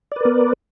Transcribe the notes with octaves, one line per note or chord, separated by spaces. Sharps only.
B3 A#4 B4 D5